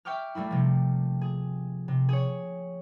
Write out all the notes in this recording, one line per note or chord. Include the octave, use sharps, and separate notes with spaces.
E5 G5 C#6 D6 F6
G3 A3 A#3 E4
C3 F3
G#4
C3
G#4 C#5